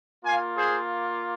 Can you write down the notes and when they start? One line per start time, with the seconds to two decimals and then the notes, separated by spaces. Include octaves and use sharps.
0.25 A#3 F4 F5 G#5
0.57 G#4 C5